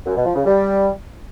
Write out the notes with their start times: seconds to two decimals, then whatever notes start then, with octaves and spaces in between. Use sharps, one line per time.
0.06 F#2
0.16 B2
0.25 F3
0.35 C#3
0.45 G3